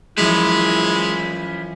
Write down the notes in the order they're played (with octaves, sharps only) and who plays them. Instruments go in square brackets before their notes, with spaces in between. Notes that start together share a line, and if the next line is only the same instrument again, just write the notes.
[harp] F#2 E3 F3 [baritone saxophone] G#3 [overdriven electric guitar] C#4 B4 [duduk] E4